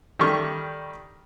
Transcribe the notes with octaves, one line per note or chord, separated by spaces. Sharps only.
D#3 G3 A3 G4 C#6 F6